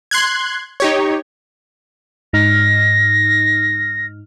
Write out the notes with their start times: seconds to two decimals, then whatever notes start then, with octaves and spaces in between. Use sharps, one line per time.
0.11 C6 F#6 G#6
0.80 D#4 G4 C#5
2.33 G#2 D#4 F6 A#6